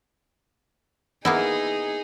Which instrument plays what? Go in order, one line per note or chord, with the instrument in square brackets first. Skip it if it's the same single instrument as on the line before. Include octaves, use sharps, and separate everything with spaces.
[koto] A#3 B3 E4 [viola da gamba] D#4 G#4